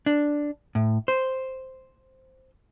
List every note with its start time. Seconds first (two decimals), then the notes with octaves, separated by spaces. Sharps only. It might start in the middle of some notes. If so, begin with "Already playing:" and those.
0.06 D4
0.75 A2
1.08 C5